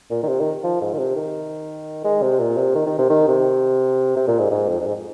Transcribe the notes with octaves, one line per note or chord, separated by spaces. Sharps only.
A#2
D#3
C3
D#3
F3
G#2
D#3
C3
D#3
G#3
C3
A#2
C3
D#3
D#3
C3
D#3
C3
C3
A#2
G#2
G#2
F2
F2
G#2